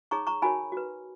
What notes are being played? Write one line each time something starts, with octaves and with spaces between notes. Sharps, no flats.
D#4 G#4 C#5 A#5 C#6
A#5 C#6
D#4 F#4 A#4 C#5 G#5 B5
F#4 B4